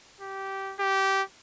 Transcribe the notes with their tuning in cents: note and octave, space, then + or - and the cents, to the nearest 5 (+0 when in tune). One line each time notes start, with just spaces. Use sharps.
G4 -15
G4 -15